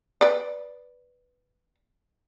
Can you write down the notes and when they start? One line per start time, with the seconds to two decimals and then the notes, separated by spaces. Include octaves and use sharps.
0.21 B4 D5